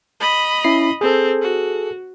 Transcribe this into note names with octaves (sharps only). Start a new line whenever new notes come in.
D#5 B5
C#4 E4 C7
C4 G#4 A4
F#4